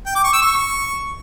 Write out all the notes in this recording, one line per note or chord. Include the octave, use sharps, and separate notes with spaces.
G5
D6
C#6
E6
C#6